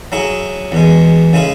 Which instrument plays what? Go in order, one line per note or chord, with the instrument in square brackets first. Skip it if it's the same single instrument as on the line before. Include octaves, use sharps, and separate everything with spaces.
[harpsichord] F#3 E4 G#4
E2 B2 G#3
C#3 G#3 E4 G#4